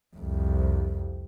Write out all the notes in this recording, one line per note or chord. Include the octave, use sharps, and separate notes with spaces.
C2 F2